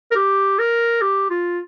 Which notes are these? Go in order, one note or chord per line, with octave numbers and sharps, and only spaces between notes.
A#4
G4
A#4
G4
F4